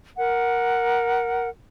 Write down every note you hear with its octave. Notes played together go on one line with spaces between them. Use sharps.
A#4 F#5